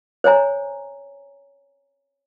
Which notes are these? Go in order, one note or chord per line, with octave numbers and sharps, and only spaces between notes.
C5 C#5 G#5 A#5